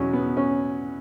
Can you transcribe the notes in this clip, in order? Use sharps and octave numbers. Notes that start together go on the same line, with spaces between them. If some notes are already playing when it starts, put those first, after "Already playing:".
Already playing: E2 B2 F#3 C#4
B3
C#4